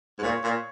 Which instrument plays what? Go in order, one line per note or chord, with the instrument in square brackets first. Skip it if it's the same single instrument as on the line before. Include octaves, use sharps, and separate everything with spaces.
[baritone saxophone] G#2
[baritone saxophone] A#2 [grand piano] C#5
[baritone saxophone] A#2